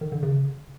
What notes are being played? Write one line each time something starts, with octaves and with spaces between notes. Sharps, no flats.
D#3
D3
C#3